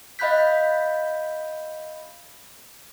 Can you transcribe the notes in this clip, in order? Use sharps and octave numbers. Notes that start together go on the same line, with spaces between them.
D#5 F5 B5 F#6 G6 B6